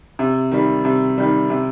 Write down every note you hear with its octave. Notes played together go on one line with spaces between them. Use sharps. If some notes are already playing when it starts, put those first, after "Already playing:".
C3
D#3 G3
C3
D#3 G3
C3